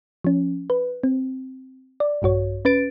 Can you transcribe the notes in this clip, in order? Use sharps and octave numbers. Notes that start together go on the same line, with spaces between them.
F3 C#4
B4
C4
D5
A#1 G2 F#4 C#5
C#4 B4 A6 D7